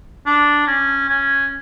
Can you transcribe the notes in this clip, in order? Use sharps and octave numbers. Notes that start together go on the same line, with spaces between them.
D4
C#4
C#4